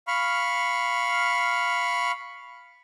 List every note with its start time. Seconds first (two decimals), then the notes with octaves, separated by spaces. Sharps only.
0.07 F5 B5 C#6 F6